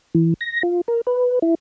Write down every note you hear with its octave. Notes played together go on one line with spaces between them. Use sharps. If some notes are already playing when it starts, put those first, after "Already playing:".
E3
A#6
F4
A#4
B4
E4